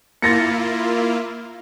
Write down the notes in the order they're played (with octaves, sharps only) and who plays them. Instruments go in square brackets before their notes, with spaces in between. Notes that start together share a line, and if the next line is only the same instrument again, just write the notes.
[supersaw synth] A#3 E4 F4 [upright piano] A6 A#6 C#7